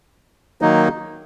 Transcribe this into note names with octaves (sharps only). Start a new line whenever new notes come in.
D#3 F#3 A#3 D#4